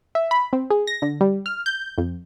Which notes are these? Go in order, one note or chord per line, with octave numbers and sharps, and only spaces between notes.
E5
B5
C4
G#4
A#6
D3
G3
F6
G6
F2